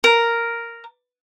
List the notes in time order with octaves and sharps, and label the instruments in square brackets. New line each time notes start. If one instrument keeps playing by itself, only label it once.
[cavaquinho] A#4